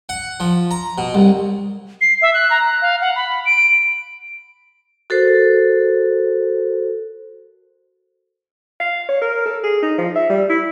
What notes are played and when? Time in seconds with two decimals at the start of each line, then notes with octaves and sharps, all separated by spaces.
0.09 F#5
0.40 F3
0.71 A#5
0.98 B2
1.14 C2
2.01 C7
2.22 E5
2.34 F#6
2.50 A#5
2.64 F#6
2.82 F5
3.01 F#5
3.16 B5
3.45 D7
5.10 F#4 A4 A#4 C5
8.80 F5
9.09 C#5
9.22 A#4
9.46 A4
9.64 G#4
9.83 D#4
9.98 F3
10.15 E5
10.30 G3
10.50 E4